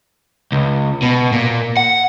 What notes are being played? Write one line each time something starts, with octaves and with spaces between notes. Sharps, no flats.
C#2
B2
A#2
F#5